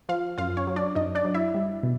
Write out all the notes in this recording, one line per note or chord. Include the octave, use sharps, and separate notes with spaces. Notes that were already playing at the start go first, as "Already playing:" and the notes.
F3 F4 F5
F#2 F4 F5
C#4 C#5
F#3
D4 D5
F#2 D#4 D#5
D4 D5
F#3
E4 E5
G3
B2